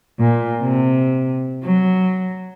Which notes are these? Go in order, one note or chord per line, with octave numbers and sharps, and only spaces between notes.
A#2
C3
F#3